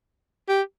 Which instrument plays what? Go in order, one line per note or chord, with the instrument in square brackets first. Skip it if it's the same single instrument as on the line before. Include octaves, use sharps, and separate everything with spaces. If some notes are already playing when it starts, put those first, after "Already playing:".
[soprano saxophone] G4